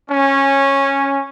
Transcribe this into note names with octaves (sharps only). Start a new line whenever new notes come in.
C#4